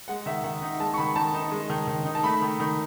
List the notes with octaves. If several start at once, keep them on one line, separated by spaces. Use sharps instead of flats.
G#3 F#5
D#3 E5
D#3 F#5
D#4
G#3 A5
C#6
D#3 B5
D#3 A5
D#4
G#3
D#3
D#3
D#4
A5
A3 B5
D#3
D#3